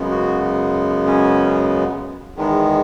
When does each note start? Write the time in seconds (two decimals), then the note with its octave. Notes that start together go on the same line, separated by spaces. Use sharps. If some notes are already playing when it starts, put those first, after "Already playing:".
Already playing: F#2 C#3 G#3 B3
0.11 F#4
1.07 C#4
2.36 E2 D#3 G#3 B3